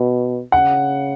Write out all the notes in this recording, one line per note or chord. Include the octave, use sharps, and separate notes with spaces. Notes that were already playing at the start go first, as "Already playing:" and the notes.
Already playing: B2
C#3 F#5